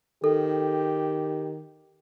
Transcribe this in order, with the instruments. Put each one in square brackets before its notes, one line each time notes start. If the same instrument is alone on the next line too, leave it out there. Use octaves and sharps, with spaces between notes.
[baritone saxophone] D#3 [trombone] G4 [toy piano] A4